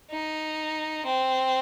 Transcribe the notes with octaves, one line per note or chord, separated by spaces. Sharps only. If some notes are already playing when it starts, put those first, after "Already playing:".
D#4
C4